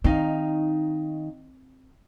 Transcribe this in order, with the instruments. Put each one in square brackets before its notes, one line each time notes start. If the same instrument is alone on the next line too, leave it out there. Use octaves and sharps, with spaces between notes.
[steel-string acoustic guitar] D#3 D#4 F5 [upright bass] C4